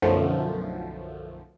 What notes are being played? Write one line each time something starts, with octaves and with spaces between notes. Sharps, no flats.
B1 F#2 D3 F3 A3